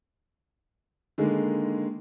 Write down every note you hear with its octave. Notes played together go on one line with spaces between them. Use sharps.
D3 D#3 G#3 A#3